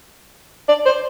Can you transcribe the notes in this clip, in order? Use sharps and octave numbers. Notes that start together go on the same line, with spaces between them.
D5
C5